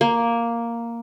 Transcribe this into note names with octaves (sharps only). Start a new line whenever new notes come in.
A#3